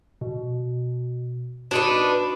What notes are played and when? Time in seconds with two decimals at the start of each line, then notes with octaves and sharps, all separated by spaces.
0.21 B2
1.71 D4 D#4 F#4 B4